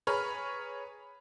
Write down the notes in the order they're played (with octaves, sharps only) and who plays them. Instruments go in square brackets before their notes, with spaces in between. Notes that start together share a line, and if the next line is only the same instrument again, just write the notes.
[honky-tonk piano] G#4 B4 C#5 A#5 B5 F6